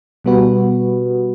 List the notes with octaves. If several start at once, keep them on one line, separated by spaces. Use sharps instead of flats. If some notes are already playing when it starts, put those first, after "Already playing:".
B2 G3 B3 F#4 B4